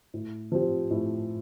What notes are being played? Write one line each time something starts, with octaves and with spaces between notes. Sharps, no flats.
A2
F3 C4 G4
A2